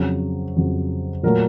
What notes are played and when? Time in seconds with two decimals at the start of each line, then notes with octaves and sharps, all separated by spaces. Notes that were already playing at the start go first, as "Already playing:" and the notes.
Already playing: F2 C#3 F#3
0.56 F2 C#3 F#3
1.23 A#2 F#3 A3 A#4